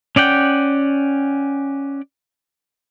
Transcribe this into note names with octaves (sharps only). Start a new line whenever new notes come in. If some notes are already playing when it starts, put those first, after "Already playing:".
C#4 D5 F#5 G5